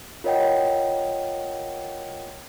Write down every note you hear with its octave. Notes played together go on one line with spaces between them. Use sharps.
F4 A#4 C#5 D#5 F#5 G5